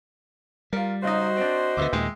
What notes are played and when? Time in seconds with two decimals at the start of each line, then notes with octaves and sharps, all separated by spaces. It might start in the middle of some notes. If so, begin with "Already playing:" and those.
0.73 G3 F4 A#4
1.03 C#3 F#3 D#4 F#4 C5 D#5
1.37 C4 D4
1.77 D2 B2 D3 B3 E5 D6
1.93 D#2 A#2 D#3 G#3 E5 G5